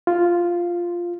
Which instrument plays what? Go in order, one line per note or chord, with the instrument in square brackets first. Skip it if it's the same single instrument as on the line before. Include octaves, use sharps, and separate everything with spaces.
[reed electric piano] F4